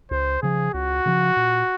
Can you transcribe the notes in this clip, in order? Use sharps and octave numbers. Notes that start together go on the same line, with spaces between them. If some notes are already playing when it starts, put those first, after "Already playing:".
C#2 C5
C#3 F3 G#4
C#2 F#4
C#3 F3
A#2